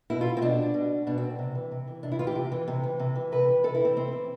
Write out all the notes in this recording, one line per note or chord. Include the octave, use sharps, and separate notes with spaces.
B2 E4
F4
C4
B2 D4
B2
B2 D4
C4
C3
E3
C3
E3
C3 D4
E4
E3 F4
G4
C3
E3
C3
E3
C3
E3
C3 B4
E3
C3 A4
E4
E3 C4
C3 C4
E3